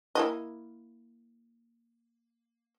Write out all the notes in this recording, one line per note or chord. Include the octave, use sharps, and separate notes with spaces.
A#3 E4 D#5